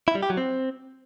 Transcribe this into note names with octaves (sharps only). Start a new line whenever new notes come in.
E4
G3
G4
F#3
C4